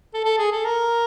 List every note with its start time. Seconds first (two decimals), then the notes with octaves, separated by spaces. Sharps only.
0.14 A4
0.24 A4
0.38 G#4
0.52 A4
0.65 A#4